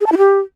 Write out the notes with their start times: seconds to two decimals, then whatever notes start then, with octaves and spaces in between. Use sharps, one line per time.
0.01 G#4
0.06 A5
0.12 E4
0.18 G4